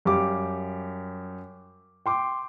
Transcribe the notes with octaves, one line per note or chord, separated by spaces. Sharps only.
F#2 G3 G4 F5 D6
G5 C6 D6